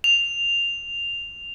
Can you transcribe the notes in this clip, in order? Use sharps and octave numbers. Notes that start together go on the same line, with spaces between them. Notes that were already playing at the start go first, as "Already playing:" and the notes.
F7